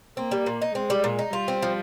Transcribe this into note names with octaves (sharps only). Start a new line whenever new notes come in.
A#3 C4
G3
A#2
D#4
G#3 C4
G3
A#2
D#4
G3 F4
C4
F3